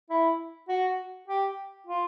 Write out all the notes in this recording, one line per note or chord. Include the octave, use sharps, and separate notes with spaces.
E4
F#4
G4
F4